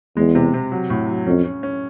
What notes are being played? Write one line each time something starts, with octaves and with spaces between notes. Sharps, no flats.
E2 G#3
C3
C3
F#3
A2
F#3
F2 C#4
C#4
C#4